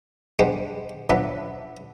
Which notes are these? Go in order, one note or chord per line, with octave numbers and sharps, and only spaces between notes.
G3 G#3 B3 D4 C5
F3 F#3 B3 D4 B4 E5